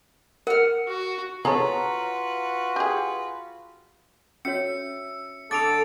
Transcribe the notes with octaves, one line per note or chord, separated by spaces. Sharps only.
A#4 F#5 F6
F#4
F4 F#4 G#4 A4 B4 C#5 A#5
G4 G#4
C#4 F#4 C#5 E5 C#7
D3 A4 D6 D#6 A6 D7 F7